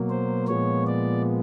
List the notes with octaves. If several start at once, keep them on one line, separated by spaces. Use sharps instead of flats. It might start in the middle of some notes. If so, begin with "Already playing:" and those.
Already playing: B2 F#3 A#3
C5
A#2 F3 G#3 B3 C#5
D5